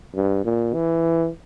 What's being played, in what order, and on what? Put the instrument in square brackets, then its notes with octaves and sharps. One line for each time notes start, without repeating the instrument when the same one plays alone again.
[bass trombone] G2
A#2
E3